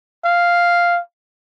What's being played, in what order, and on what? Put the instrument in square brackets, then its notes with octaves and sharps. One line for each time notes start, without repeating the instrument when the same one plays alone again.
[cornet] F5